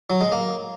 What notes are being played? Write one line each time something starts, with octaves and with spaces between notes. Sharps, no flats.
F#3
G#3
A#3